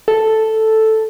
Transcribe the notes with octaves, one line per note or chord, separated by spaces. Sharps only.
A4